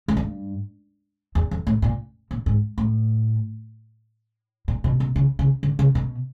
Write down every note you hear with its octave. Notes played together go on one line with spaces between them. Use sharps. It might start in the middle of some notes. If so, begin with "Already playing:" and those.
G#2
G2
E2
F2
A2
A#2
A#2
G#2
A2
A#2
B2
B2
C#3
C#3
D3
C#3
B2